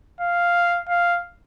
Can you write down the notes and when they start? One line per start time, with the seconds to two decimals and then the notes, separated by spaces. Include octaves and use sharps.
0.21 F5
0.89 F5